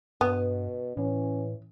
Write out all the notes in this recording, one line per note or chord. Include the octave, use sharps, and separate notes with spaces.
G2 B2 B3
A2 E3 C#4